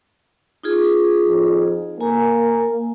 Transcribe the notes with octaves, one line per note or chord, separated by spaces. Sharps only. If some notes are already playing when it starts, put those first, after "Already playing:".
D#4 F4 G#4
F2
A#3 G#5 A#5